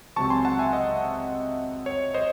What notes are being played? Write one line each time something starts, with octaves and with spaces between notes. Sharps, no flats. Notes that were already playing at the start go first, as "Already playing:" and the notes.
C#2 C3 F#3 C4 A5 C#6
G#5 C6
F#5 A5
E5 G#5
D#5 F#5
C#5
C5 D#5